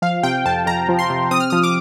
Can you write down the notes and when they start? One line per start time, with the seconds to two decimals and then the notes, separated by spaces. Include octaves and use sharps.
0.02 F3 F5
0.23 C3 G5
0.45 F2 A5
0.66 F2 A#5
0.89 F3
0.99 C6
1.10 C3
1.31 C4 D#6
1.40 F6
1.50 F3 D#6
1.63 D6